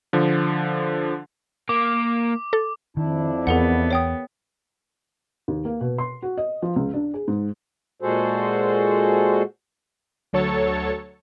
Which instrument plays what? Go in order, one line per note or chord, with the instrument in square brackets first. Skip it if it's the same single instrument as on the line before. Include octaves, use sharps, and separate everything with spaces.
[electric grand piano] D3 F3
[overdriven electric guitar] A#3 [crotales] D6
[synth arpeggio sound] A4
[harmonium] F2 D4 E4 [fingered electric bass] D#3
[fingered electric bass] E2 [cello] B3 [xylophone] G#4 A#4 F#5
[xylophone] C#5 G5 D#6
[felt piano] D#2
A#3
B2
C6
F#4
D#5
F3
C#2
D4
G#4
G#2
[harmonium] A#2 G#3 F#4 G#4 A4 C5
[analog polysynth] D2 F#3 A4 C#5 A6 C#7